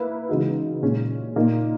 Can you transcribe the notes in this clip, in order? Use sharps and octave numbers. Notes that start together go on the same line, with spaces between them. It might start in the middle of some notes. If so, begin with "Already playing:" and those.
Already playing: A#3 E4 B4
C#3 E3 G#3 D#4 F#4
A#2 G#3 C#4
A#2 A#3 D#4